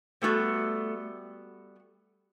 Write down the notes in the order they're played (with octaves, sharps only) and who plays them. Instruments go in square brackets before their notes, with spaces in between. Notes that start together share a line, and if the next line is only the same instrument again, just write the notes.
[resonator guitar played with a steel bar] G3 B3 F#4 A4 [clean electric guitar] A3